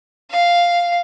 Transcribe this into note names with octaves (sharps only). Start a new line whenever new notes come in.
F5